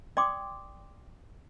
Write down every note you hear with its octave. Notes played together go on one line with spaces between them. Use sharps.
D5 G5 C6 D6 D#6